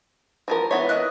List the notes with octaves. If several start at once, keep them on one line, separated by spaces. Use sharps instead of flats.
E3 F3 A#4
E3 B3 C#5 E5
E4 D#5 F#6